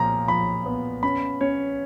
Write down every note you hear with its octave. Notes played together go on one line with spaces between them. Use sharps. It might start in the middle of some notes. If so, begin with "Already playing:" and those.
Already playing: A#2 F3 A#5
F3 B5
B3
C#4 B5
C#4 C#5